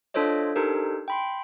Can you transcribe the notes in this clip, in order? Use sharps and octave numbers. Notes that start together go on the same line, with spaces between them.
D4 F4 A4 C5 C#5 D#5
D4 D#4 G4 A4 A#4 C5
G5 B5 C6